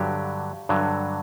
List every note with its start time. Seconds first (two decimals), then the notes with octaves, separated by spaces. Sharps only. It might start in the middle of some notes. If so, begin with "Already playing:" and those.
Already playing: G2 D3 F#3 G4
0.69 G2 D3 F#3